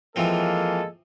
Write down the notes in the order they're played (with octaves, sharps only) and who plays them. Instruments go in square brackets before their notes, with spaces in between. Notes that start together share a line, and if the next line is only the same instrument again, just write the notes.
[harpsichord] E3 F3 C4 [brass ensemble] G#3 A#3 A4